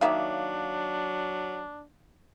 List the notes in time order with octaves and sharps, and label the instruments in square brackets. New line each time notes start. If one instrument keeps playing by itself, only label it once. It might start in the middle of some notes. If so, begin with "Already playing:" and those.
[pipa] D#3 A#3 [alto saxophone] F#3 [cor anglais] D4 [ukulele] C#5 E5 F5